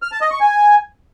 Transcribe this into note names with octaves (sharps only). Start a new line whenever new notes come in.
F6
A5
D#5
C#6
G#5